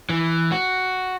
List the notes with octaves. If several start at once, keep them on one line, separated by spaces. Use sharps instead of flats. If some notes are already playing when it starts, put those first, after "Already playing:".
E3
F#4